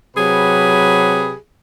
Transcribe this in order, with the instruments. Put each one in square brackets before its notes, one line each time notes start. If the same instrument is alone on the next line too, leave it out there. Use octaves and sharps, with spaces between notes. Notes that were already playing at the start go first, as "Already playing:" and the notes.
[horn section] C3 F#3 G4 G#4 B4 B5